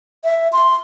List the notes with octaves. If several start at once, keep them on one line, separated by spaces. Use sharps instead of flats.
E5
C6